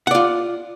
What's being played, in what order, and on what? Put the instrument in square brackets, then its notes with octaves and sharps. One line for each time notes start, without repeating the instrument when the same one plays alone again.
[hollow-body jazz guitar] F#5
D5
F4